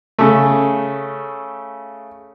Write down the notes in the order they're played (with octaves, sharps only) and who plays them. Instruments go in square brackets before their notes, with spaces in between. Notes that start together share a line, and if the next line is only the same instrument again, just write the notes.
[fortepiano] C#3 A3